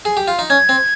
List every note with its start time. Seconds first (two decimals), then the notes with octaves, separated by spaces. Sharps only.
0.05 G#4
0.17 G4
0.28 F4
0.39 D#4
0.50 C#4 G#6
0.69 C4